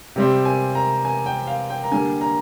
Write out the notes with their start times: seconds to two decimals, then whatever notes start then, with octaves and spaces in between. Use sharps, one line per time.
0.16 C3 G3 C4
0.45 G#5
0.75 A#5
1.05 G#5
1.26 G5
1.47 F5
1.70 G5
1.84 A#5
1.91 D3 G3 A#3 G#5
2.21 A#5